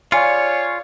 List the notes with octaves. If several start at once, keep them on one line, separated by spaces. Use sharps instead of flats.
F4 G#4 C#5 D5 F5 G#5 C#7